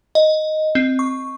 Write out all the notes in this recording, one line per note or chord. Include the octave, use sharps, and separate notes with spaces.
D#5
C4
C#6